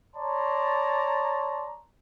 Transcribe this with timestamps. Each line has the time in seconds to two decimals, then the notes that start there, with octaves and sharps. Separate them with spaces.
0.16 C#5 D5 A5 A#5 C6 C#6